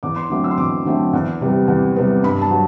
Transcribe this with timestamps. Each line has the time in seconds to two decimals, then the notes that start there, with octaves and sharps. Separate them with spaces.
0.03 E2 D6
0.16 C6
0.30 D3 F#3 A3 C4 D6
0.44 E6
0.51 C6
0.58 E2 D6
0.85 D3 F#3 A3 C4
1.13 E2
1.41 C3 G3 B3
1.68 E2
1.96 C3 G3 B3
2.23 G2 B5
2.41 A5
2.51 F#3